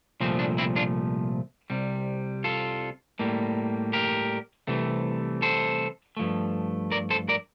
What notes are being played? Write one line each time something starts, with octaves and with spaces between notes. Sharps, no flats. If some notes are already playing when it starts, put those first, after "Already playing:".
C2 A#2 F3 A3 C4
D4
C4 E4
D4 F4
C2 C3 G3
F4 A4
A2 G3 A#3
G4 A#4
C2 C3 E3 A3
A4 C5
G2 F3 A3
A#4 D5
A4 C5
A#4 D5